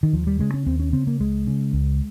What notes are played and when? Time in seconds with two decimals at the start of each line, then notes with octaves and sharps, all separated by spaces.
0.03 D#3
0.13 D#2 F3
0.27 G3
0.39 C#3 G#3
0.54 C#4
0.66 D#2 C4
0.80 C#4
0.92 C#3 C4
1.07 A#3
1.20 C#2 G#3
1.47 C#3
1.73 C#2